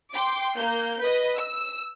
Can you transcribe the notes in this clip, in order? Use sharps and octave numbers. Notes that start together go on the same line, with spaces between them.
G5 C6 D6
A#3 G6
B4 D#5
E6